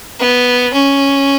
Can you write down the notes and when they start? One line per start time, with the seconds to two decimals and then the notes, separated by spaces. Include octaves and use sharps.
0.19 B3
0.73 C#4